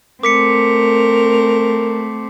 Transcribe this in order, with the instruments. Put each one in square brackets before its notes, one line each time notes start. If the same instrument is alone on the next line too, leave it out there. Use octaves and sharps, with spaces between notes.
[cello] A3 C4 [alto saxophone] A#4 [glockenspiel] D6 B6 C#7